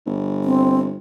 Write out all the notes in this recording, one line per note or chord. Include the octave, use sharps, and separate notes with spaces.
G1
C4